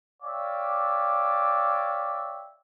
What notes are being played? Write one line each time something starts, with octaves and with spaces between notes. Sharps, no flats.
C#5 D5 E5 F5 G5 D6